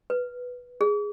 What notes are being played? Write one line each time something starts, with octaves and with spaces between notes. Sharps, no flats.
B4
G#4